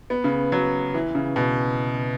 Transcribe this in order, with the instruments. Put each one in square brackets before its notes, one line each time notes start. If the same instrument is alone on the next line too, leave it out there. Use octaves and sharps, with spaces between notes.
[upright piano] B3
C#3
F#3
E3
C#3
B2